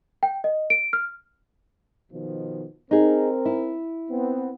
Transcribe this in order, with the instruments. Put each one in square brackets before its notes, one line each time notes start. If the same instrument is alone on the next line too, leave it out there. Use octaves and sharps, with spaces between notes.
[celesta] G5
D#5
D7
F6
[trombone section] B2 D#3 F3
[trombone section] C4 A#4 [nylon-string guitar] D#4 G#4
[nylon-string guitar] E4
[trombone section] B3 C4